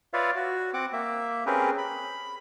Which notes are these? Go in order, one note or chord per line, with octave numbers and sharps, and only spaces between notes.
F4 B4 C#5 D5 E5 F5
F#4
C4 F#5 D6
A#3 E5
C4 C#4 G4 G#4 A#4 B4
B5